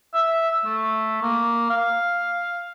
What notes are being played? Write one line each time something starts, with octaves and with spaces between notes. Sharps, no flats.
E5
A3
A#3
F5